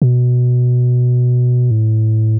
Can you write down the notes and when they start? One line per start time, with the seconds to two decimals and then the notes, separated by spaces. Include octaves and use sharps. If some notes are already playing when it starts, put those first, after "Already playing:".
0.02 B2
1.71 A2